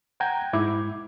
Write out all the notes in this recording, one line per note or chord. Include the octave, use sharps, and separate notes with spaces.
F#5 G5 A#5 G6 G#6
G#2 E4 D6 G#6